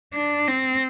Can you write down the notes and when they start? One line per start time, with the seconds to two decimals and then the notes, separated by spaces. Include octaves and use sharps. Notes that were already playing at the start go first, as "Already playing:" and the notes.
0.14 D4
0.48 C4